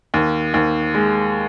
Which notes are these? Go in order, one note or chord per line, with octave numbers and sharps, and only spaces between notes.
D#2
D#2
G#3